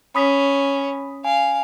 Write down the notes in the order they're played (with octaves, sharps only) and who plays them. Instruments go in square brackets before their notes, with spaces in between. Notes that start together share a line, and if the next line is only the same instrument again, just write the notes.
[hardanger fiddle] C#4 [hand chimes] B5 D#6 B6
[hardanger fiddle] F5 [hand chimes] G#5